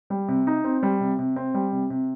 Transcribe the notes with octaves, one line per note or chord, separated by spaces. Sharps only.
G3
C3
D#4
C4
G3
C3
C3
C4
G3
C3
C3